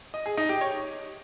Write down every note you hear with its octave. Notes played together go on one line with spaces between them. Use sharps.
D#5
G#4
D#4
G4
C#5